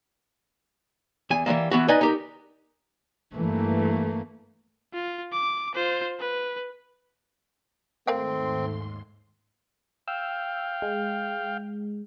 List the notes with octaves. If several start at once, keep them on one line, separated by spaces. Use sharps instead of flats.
E2 G#5
E3 G3 G#3 A#3
E3 B3 F#4
D#4 B4 D5 D#5 G#5
D#4 G4 A#4
G2 E3 A3 A#3
F4
D6
F4 C5
B4
D#2 G#2 A3 C4 A#4 F5 G5 C6
F5 G5 E6
G#3